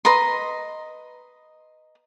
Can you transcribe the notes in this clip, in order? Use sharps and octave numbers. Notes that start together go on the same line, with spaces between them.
B4 D#5 A#5 C6